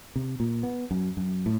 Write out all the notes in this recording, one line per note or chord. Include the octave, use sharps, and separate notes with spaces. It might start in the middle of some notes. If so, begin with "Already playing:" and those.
C3
A#2
B3
F#2
F#2
A2